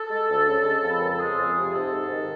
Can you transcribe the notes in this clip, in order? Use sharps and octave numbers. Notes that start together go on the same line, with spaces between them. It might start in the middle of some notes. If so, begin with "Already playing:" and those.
Already playing: A4
G#3
D2
C#3
G#3
F2
B4
C#3 A#4
A4
G#3 G#4
F2
C3
G#2 A4
G#2
D#3